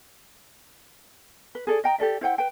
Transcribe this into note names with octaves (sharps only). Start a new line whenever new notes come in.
B4
G#4 A4 D5
D#5 G5 A#5
G4 A4 D5 E5
E4 C5 F#5 G5
B4 G5